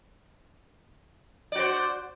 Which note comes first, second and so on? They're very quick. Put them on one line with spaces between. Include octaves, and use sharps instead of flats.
D5 F#4 C5